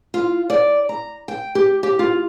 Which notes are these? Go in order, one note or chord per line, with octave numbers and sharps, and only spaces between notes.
F4
D5
A#5
G5
G4
G4
F4